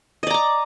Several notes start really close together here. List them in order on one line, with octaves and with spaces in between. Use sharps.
D#5 D5 A#5 D6